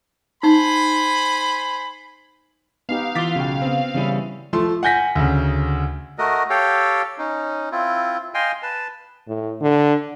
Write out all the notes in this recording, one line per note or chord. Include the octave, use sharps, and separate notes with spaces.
D#4 C5 G#5 B5
B3 D#4 G4 F5
E3 F4 D6 A6 B6
B1 C#3 F#4 G5
B3 C4
C#3 E3 G3 C#4 E4
F3 A3 C6
F#5 G#5 G6 A#6 B6
D2 C#3
A3 F#4 A#4 D#5
G4 A4 C#5 F5 G5
C#4 D#4
C4 E4 F4
D#5 F5 G5 G#5 C6
B4 A5
A2
D3